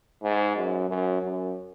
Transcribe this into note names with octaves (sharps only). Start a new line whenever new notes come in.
G#2
F#2
F#2
F#2